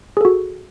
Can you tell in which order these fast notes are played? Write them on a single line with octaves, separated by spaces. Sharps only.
G#4 A4 F#4